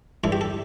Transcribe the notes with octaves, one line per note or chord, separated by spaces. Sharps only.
G2 E3 A4
G4
A4